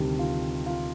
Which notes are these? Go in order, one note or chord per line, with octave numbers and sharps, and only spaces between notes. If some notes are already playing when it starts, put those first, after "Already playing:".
Already playing: D2 C3 D#3 G3 G4
F4
F4